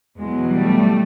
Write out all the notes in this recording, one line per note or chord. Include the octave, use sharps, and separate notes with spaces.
E2 B2 F#3 G#3
G3 A3